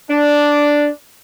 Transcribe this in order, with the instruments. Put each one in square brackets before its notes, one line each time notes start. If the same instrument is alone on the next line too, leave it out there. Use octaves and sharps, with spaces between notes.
[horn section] D4